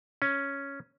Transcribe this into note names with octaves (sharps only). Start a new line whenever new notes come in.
C#4